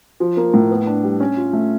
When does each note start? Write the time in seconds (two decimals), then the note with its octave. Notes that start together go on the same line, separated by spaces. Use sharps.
0.20 F3
0.37 A#3
0.54 A2
0.70 B3
0.87 D4
1.04 G3
1.20 C#4
1.37 F4
1.53 A3